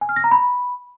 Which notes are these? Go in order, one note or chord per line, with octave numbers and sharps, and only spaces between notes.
G#5
F6
A#6
A#5
B5